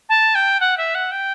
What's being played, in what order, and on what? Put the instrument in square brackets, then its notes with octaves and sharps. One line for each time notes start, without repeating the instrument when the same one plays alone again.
[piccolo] A5
G5
F#5
E5
F#5
G5